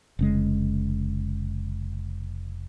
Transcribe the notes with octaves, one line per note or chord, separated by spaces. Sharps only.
F1 C#3 G#3